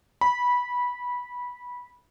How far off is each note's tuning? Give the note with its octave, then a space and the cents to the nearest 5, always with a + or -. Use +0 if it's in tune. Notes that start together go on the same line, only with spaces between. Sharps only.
B5 -15